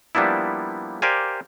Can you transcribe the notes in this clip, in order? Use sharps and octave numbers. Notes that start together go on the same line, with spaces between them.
F3 G3 A#3 B3 D4 E4
G4 A#4 C5 D5 F5 G#5